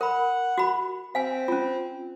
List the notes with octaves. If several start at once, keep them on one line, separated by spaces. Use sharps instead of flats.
A#4 F#5 B5
F#4 B5
C4 F5 G#5
C#4 F4